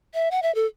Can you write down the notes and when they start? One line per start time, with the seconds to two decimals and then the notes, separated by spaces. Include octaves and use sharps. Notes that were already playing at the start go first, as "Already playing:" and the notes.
0.14 E5
0.31 F#5
0.42 E5
0.55 A4